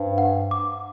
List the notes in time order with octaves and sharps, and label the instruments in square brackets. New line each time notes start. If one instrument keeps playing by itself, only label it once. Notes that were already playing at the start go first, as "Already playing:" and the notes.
Already playing: [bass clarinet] G2 [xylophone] C5
[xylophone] F#5
D6